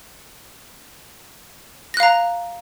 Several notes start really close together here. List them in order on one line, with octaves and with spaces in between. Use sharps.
A#6 F#6 F5 A#5